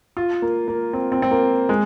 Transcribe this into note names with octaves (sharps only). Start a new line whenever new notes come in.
F4
A#3
A#3
C4
C4
C4
A#3
G#3